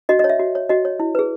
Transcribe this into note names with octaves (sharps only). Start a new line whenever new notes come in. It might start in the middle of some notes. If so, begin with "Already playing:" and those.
F#4 D#5
D#5
C#5
E5
F#4
C#5
F#4 D#5
C#5
E4
G#4 B4